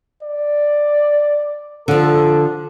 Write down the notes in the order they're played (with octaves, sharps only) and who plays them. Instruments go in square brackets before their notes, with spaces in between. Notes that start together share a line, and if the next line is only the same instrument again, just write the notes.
[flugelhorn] D5
[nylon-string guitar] D3 F3 [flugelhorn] A4